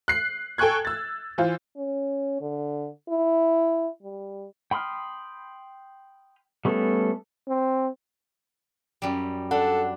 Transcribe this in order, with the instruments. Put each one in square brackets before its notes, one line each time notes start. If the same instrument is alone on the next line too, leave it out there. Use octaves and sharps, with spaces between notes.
[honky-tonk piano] F#6 C7
A4 G5 G#5 C#6 F#6 G#6
E6 A6
E3 F4 C5
[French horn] C#4
D3
E4
G3
[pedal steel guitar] G5 B5 C6 D#6 F6
G3 A3 B3 C#4 A4
[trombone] C4
[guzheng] F#2 G3
[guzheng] D4 [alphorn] A4 [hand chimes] F#5